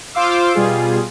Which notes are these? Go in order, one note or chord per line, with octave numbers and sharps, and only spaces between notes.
F4 C5 F5 C6 D6 E6
B2 G3 F4 G#4